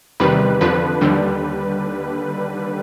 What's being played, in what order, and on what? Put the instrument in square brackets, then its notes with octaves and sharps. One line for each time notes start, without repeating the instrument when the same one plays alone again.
[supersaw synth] E2 C3 D#3 G3 B4
F2 D3 F3 B4
D#2 D3 G3